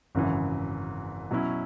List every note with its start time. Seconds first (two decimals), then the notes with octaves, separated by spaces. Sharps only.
0.15 G#1 F#2 C#3 E3
1.31 B2 F#3 C#4 E4